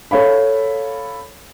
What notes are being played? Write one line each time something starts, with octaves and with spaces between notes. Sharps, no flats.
A4 C#5 F5 B5